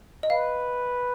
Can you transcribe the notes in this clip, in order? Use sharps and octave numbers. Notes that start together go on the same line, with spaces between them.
D#5
B4 F5